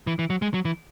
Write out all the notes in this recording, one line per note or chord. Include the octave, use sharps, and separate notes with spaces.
E3
E3
F#3
G#3
F#3
E3